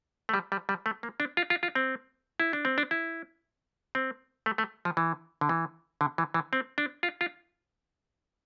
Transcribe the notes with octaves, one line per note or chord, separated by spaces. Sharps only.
A3
G3
G3
G3
A3
A#3
D4
F4
F4
F4
C4
E4
D4
C4
D4
E4
C4
A3
A3
F3
E3
D3
E3
D3
E3
E3
C4
D4
F4
F4